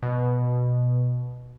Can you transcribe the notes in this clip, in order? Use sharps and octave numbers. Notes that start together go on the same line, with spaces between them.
B2